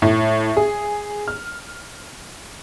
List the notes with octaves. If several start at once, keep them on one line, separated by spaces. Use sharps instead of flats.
A2
G#4
F6